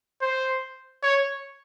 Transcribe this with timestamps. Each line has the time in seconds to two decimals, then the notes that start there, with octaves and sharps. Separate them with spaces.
0.21 C5
1.03 C#5